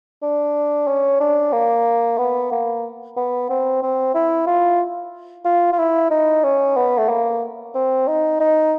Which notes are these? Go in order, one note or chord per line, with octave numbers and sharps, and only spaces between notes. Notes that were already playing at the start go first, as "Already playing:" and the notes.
D4
C#4
D4
A#3
B3
A#3
B3
C4
C4
E4
F4
F4
F4
E4
D#4
C#4
B3
A3
A#3
C4
D#4
D#4